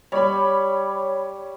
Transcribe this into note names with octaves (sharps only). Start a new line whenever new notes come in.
G3 C#5 B5